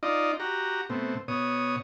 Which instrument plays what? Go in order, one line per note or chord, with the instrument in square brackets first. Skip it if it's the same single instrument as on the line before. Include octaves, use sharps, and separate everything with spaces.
[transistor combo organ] D#4 F4 D5 D#5
F#4 G4 A#5
B2 A3 C4
B2 C#5 D#6